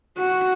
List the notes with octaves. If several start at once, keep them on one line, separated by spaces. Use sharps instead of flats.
F#4